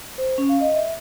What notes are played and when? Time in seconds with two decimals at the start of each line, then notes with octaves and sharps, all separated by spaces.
0.18 C5
0.38 C#4
0.49 F5
0.61 D#5
0.74 E5